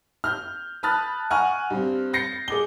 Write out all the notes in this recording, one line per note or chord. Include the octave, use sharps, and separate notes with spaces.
F6 G6
A5 B5 D#6 F6 F#6 A6
F#5 G#5 A#5 C#6 F6
G2 C4
G6 A6 A#6 C7 C#7
G#4 D6 G7